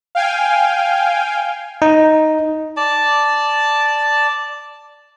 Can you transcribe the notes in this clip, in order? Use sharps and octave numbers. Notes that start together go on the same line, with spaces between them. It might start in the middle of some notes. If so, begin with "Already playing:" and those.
F5 G5 G#5
D#4
D5 A5